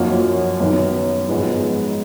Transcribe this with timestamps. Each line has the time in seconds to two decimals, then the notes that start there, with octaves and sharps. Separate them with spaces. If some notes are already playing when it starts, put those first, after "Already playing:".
Already playing: F#2 F3 A#3 D#4 F#4
0.60 F#2 D#3 F#3 B3
1.28 G#2 F3 G#3 B3 D#4